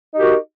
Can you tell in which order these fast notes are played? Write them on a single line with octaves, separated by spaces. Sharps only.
D#4 G4 A#4 F#4